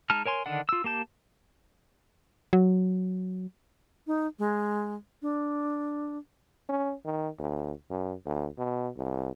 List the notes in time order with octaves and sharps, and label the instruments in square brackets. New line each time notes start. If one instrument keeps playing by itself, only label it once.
[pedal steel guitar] G#3 D#4 A5 F6
A#4 C#5 G#5 C6
D3 D#3 D4 F#5
F4 E6
A#3 G4 A5 G6
[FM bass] F#3
[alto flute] D#4
G#3
D4
[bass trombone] C#4
D#3
D2
F#2
D2
B2
C2